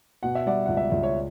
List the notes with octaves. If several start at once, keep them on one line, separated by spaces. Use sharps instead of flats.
B2 F#5
E5
G3 D5 F#5
C#2 F#5
E5
C#2 D5
C#5